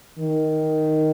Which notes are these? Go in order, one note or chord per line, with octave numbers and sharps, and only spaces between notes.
D#3